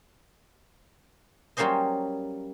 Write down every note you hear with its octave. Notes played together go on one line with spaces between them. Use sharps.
F#3 G3 A#3 C#4 C5 D#5